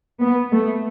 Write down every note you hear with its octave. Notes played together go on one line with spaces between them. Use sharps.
B3
A3